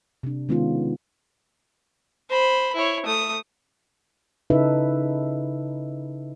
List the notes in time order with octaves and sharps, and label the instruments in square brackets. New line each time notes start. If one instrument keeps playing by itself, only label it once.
[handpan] C3 D4
D#3 G#3 B3 C#4 D#4 F4
[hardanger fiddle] C5 B5
E4 C#5
A3 D#6
[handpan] C#3 D#4 E4 A4 B4 E5